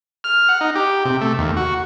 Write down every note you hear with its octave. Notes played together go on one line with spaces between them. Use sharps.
F6
F#5
D#4
G4
C3
A3
D#2
F#4